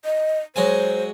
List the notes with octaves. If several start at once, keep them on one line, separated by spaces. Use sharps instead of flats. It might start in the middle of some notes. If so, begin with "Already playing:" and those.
D#5
F#3 G#3 C5 G#5